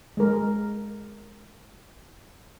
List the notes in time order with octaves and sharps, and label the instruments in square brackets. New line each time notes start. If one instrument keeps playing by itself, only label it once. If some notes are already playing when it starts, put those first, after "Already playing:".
[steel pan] G#3 A#4